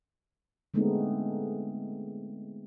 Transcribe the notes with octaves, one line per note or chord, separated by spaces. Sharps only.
D3 G#3 A3 B3 C4 D#4